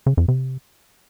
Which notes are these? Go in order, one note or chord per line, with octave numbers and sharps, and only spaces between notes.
C#3
F2
C3